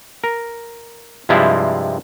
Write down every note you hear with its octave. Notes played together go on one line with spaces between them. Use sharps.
A#4
G2 C3 F3 G#3 E4 F4